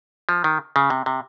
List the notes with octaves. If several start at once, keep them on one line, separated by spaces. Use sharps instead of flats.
F3
D#3
C#3
C3
C3